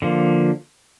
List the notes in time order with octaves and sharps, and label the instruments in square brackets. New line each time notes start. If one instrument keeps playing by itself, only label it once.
[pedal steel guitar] D3 F3 A#3